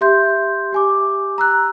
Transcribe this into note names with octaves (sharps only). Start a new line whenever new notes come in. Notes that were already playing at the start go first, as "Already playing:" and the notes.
G4 E5 C6 G6
G4 G#5 D6
A#5 E6 F#6